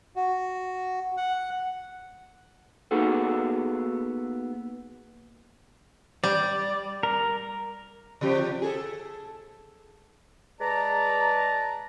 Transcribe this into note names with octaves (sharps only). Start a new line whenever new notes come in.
F#4
F#5
A#3 B3 D#4 F#4 G#4 A4
G3 D5
A#4
C3 F3 G4
G#4 A4
G#3 G#4 B4 D5 A5 A#5